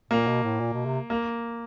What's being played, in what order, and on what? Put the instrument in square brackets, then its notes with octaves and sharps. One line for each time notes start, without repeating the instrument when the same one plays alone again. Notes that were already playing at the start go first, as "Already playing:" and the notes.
[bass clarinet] A#2 [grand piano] A#3
[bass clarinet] B2
A2
A#2
B2
C3
[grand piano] A#3